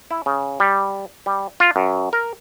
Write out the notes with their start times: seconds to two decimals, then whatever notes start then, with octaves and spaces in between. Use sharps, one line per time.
0.11 E4
0.26 C#3
0.60 G3
1.26 G3
1.60 F4
1.76 F#2
2.13 A#4